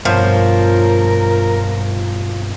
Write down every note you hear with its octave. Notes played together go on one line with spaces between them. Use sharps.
G2 B2 F3 A#4 C#5